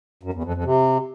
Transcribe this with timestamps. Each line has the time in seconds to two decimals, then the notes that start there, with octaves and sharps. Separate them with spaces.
0.23 F#2
0.33 E2
0.44 F2
0.54 F2
0.64 C3